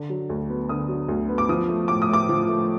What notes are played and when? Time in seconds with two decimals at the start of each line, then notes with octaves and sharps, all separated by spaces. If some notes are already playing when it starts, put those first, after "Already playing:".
Already playing: D3
0.10 F#3
0.30 D2
0.49 B3
0.69 D3 D#6
0.89 F#3
1.08 D2
1.29 B3
1.38 D6
1.49 F3 D#6
1.69 A3
1.88 A2 D6
2.02 D#6
2.09 A2 D6
2.29 F3
2.49 A3